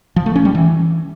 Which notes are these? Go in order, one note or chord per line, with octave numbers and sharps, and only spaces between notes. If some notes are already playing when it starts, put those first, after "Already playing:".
F3
A3
C#4
G3
E3